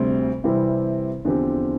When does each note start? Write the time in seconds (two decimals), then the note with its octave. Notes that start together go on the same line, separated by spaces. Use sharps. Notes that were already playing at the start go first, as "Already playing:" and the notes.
Already playing: D2 C3 G3 C4
0.44 C3 E3 G3 C4 E4
1.25 E2 D3 F3 C4 G4